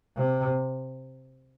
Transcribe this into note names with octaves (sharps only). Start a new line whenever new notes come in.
C3